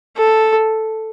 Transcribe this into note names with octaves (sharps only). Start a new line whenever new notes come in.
A4